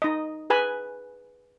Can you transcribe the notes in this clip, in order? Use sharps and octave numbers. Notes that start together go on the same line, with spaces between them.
D#4 D#5
G#4 B4 G#5 B5